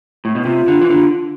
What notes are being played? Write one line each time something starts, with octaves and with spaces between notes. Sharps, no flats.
A2
B2
C3 F4
D3
E3
D3